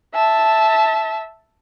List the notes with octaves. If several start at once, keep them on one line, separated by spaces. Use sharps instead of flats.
E5 A5